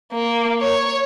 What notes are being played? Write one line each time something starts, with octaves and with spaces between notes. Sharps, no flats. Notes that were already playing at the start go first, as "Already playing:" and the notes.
A#3
C#5